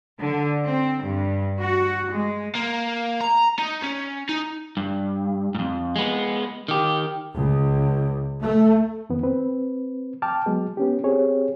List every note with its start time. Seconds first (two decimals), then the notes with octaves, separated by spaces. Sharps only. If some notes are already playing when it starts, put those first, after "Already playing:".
0.20 D3
0.63 C4
1.01 G2
1.60 F#4
2.12 G#3
2.55 A#3
3.21 A#5
3.59 D#4
3.82 C#4
4.29 D#4
4.77 G2
5.55 F2 G#2
5.96 G#3 B3
6.68 D#3 G4
7.35 C#2
8.44 A3
9.10 F2 D#3 B3
9.23 C4 B4
10.22 G5 A5 D6 F6
10.46 F#3 G#3 B3
10.77 B3 C#4 G4
11.04 C4 G4 G#4 C#5